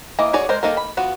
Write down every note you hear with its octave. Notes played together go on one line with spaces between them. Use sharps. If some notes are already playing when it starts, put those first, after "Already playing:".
E3 A#3 D#5
F#4 G#4 C#5 D5
G#3 A#4 C5
D#3 A#3 D#4 A4 A#4
B5
B3 F4 F#4